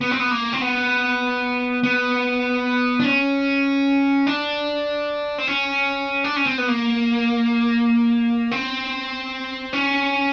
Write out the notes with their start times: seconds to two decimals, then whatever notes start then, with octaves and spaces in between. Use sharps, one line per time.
0.01 B3
0.11 C4
0.20 B3
0.31 A#3
0.53 C4
0.61 B3
1.83 B3
3.00 D4
3.05 C#4
4.27 D4
5.38 C4
5.48 C#4
6.24 D4
6.36 C#4
6.46 C4
6.58 B3
6.68 A#3
8.51 C4
9.73 C#4